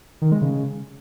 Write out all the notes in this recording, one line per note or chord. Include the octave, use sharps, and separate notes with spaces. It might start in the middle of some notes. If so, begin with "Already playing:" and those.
D#3
G#3
C#3